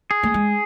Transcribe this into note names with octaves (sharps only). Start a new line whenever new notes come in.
G#4
A3
G#3